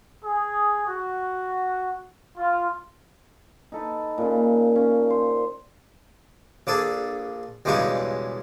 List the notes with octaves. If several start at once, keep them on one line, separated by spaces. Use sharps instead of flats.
G#4
F#4
F4
D#4 A4 B4
A#2 C#3
C#4
C5
A#1 D4 G#4 A4
B1 E2 G2 C#3 G#3 C#6